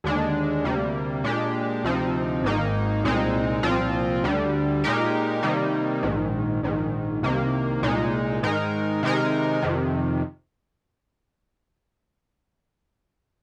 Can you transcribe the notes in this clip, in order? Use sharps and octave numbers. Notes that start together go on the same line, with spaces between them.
D#2 D3 G#3 D4
D2 C3 G3 A#3
A#2 G#3 D4 G4
D2 C3 F3 C4 D#4
G#1 G#2 D#3 A#3 D#4
C2 A#2 G#3 C4 D#4
C2 A#2 F3 C4 F4
D2 D3 G3
A#2 G#3 D#4 G4 A#4
C3 D#3 G3 A#3 D#4
A#1 G#2 D#3
A#1 G#2 D#3
C2 C3 D#3 A#3
C2 A#2 G#3 D#4
G#2 D#3 G#3 D#4 A#4
C3 D#3 G#3 D#4 A#4
F2 C3 D#3